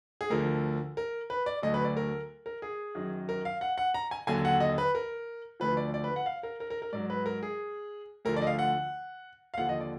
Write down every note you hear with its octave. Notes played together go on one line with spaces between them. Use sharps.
G#4
D2 D3 F3 A#4
A#4
B4
D5
D2 D3 F#3 D#5
B4
D5
A#4
A#4
G#4
F#2 D#3 F#3
A#4
F5
F#5
F#5
A#5
G#5
D#2 D3 F#3 G#5
F#5
D#5
B4
A#4
D2 D3 F3 B4
D5
D5
B4
F#5
F5
A#4
A#4
A#4
A#4
G#2 F#3 D5
B4
A#4
G#4
D2 D3 F3 A#4
D5
D#5
F5
F#5
F5
D#2 D3 F3 F#5
D#5
D5